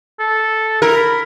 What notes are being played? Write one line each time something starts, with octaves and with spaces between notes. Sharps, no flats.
A4
E4 A#4
B5